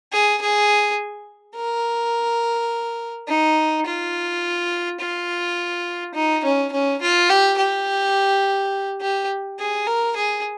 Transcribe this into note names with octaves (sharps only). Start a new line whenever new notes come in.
G#4
G#4
A#4
D#4
F4
F4
D#4
C#4
C#4
F4
G4
G4
G4
G#4
A#4
G#4